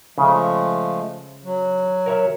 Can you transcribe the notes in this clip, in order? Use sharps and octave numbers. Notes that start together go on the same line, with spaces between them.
C#3 F3 G#3 A3
F#3
A#4 C#5 E5